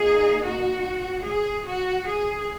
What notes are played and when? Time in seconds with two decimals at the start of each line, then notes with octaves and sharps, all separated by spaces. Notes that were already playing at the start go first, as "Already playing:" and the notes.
Already playing: A#2 A#3 D#4 G#4
0.46 F#4
1.27 G#4
1.68 F#4
2.09 G#4